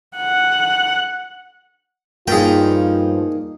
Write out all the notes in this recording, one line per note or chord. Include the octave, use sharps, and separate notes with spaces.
F#5
G2 F3 A#3 D#4 F4 G#4 G5